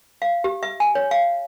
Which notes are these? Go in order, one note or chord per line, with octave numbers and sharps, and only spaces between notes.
F5
G4
E5
G#5
C#5
F5